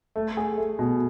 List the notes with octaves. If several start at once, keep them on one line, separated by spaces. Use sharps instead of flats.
A3
G#4
A3
B2